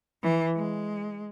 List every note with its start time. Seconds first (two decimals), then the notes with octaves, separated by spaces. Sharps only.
0.23 E3
0.55 G#3